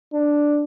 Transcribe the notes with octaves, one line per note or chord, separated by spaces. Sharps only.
D4